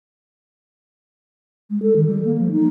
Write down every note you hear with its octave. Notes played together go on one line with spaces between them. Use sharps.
G#3
A4
D#3
G3
A#3
F3
D#4